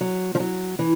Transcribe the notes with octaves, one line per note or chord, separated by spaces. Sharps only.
F#3
F3
F#3
E3